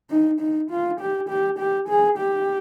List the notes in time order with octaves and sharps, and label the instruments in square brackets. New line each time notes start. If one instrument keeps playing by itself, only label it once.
[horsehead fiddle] D#4
D#4
F4
G4
G4
G4
G#4
G4